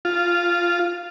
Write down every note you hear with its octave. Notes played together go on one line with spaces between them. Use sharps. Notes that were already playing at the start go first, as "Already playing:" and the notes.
F4